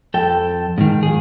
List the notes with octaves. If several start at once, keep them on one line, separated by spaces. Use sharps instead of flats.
F2 A4 G5
G#2 D#3
F2 G#4